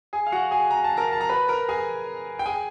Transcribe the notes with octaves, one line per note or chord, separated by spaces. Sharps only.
G#4 G#5
F5
F#4 F#5
G#4 G#5
A#5
A5
A#4 A#5
A5
A#5
B4 B5
A#4 A#5
G#4 G#5
G5
G#4 G#5